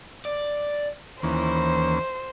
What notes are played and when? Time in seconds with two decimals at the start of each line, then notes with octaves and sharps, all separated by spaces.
0.25 D5
1.23 D#2 E3 A#3 C#4 C5